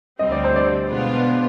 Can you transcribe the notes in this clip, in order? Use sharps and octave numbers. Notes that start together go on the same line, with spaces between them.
D2 D3 G3 C4 D#5
D5
C5
D5
B2 G#3 B3 D4 F4